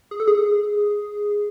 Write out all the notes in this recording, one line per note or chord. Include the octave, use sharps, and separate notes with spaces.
G#4
A4
G#4